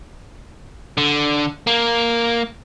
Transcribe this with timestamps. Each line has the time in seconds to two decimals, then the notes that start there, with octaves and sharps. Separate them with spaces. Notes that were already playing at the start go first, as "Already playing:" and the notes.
0.97 D3
1.67 A#3